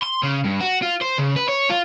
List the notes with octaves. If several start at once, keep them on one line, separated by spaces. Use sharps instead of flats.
C6
C#3
G2
F#4
F4
C5
C#3
B4
C#5
F4